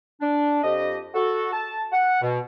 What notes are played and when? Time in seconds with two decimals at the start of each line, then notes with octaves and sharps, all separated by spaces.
0.21 D4
0.64 F2 G4 D#5
1.14 F#4 A4
1.53 A5
1.92 F#5
2.22 B2